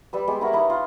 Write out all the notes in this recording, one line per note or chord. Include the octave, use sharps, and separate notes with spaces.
G3 B4 E6
G#3 B3 G4
E4 A#4 F#5 C#6
D#4 E4 B4 C#5
F4